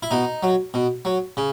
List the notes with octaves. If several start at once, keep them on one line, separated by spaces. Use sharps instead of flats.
E4
B2 D#4
F#3
B2
F#3
C#3